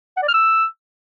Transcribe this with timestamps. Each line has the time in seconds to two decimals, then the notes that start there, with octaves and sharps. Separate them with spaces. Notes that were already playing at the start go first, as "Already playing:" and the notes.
0.17 F#5
0.22 D5
0.28 F6
0.34 E6